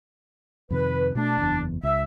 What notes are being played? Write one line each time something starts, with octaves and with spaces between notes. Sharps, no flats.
F2 C3 D#3 B4
B2 A3 D4
F#1 E2
C#2 E5